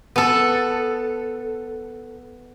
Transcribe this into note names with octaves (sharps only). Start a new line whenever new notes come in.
B3 A4